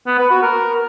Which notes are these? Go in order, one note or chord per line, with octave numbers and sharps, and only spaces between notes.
B3
B4
F#4
A#4